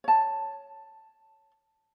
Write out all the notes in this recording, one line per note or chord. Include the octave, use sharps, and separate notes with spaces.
C#5 A5